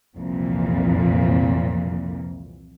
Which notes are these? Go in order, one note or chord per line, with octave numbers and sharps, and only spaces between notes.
C2 F2 A#2 E3